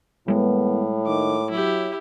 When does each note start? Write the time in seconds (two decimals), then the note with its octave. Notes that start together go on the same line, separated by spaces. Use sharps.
0.28 E2 A2 G3 G#3 A#3 B3
1.07 D#3 D6
1.50 F#3 E4 G4